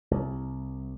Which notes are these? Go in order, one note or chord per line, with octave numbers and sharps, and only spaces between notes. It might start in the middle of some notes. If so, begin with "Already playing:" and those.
C2